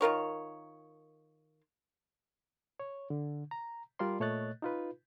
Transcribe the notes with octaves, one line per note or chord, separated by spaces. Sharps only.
D#3 F4 A#4 C#5
C#5
D3
A#5
G3 F4 A#4 D5 C6
A#2 A3 C#5 D#5 F#6 A6
D#4 F4 B4